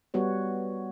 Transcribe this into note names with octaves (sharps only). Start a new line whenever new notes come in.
G3 B3 F#4 C#5